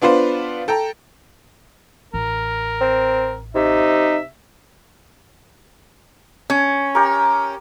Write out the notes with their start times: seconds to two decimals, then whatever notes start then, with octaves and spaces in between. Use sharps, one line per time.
0.02 B3 D4 F4 B4 C5
0.68 A4 G5 A#5
2.14 A1 A#4
2.81 C4
3.55 C3 D#4 E5
6.50 C#4
6.95 G4 A#4